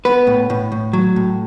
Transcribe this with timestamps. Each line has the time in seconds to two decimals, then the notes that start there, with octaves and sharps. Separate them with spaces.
0.05 B3 B4
0.27 A2
0.50 A2
0.72 A2
0.93 F#3
1.16 A2